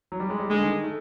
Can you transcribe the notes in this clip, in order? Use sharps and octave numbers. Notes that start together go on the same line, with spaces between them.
F#3
G3
G#3
G3
D3 G#3
D#3
A3